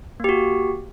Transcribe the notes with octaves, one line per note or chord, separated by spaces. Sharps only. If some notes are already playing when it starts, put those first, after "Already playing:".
A#3 F#4 G4